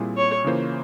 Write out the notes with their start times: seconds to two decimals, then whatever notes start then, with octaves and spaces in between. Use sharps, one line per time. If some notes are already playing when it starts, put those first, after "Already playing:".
Already playing: A#2 G3 C4 E4 G#4
0.17 C#5
0.44 C#3 E3 A#3 F4 C5